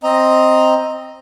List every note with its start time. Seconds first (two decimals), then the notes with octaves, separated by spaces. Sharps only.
0.03 C4 D#5 A#5